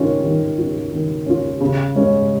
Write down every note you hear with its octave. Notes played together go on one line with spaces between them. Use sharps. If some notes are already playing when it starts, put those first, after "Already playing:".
Already playing: D#3 C#4 F4
D#3
C#4 F4
D#3
C#4 F4
C#3
G#3 C#4